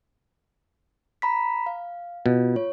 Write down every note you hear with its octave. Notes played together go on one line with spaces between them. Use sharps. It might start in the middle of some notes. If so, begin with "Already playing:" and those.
A#5 B5 B6
F5
B2 F4
C#5